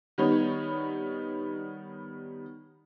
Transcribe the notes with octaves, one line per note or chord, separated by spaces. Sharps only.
D#3 G3 B3 D#4 C#5